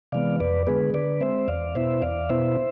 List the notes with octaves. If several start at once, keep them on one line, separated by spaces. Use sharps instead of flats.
C3 E3 G#3 B3 D5 F5
F2 B4 D5
D3 G#3 B3 G#4 B4
D3 B4 D5
G#3 C4 C5 E5
E2 D5 F5
B2 B3 E4 C5 E5
E2 D5 F5
B2 B3 E4 C5 E5